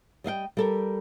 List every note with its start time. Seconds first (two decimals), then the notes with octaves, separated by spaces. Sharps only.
0.24 G3 D#5 F5 G5
0.57 G3 A4 A#4